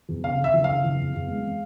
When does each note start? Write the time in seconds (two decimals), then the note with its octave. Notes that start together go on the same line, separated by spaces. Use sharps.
0.09 E2
0.24 C#3 F5
0.38 C#3
0.44 E5
0.54 E3
0.64 C#3 F5
0.84 E3
0.99 E2
1.14 E2
1.28 G#3
1.44 C4